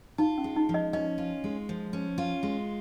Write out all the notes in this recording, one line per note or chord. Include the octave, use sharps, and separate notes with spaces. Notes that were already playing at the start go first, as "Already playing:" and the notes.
D#4 F4
C#4
G#3
D#4
F3
D#5
C#4 D#5
F4
G#3
F3
C#4
F4
G#3